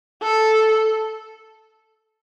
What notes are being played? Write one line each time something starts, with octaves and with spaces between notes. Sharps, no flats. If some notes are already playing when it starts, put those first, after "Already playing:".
A4